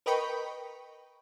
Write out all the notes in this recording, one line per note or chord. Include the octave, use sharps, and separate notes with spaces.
A#4 B4 D#5 G5 B5 C#6